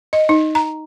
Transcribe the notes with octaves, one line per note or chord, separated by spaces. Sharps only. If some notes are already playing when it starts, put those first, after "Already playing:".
D#5
D#4
A#5